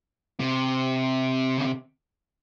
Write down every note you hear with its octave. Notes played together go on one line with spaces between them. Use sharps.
C3
C#3